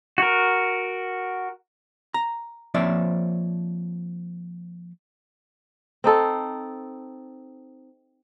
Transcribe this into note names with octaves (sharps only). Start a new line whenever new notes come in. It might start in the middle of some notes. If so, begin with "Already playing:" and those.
F#4 A#4
A#5
F3 A#3 C4 C#5 D5 E5
C4 D#4 A4